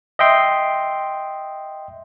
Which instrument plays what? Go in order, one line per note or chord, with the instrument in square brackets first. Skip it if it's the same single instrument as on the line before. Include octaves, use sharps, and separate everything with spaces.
[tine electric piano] D#5 E5 G5 C6